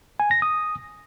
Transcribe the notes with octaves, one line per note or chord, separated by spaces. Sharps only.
G#5
A#6
D#6